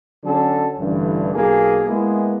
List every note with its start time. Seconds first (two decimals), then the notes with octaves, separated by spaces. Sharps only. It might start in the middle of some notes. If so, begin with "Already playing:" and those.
0.24 D3 F#3 C#4 A4
0.79 A1 G2 D3 E3
1.35 B1 A#3 G#4
1.88 G#3 A#3 B3 E4